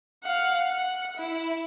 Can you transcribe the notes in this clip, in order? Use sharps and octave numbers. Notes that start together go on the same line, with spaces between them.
F5 F#5
F#5
E4